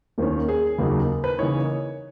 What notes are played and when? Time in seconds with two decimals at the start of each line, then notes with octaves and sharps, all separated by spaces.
0.18 D#2 D#3 A#3 C#4
0.48 G#4
0.78 D#2 C#3 F#3 A#3 D#4
1.24 B4
1.39 C#3 E3 A#3 D#4 C#5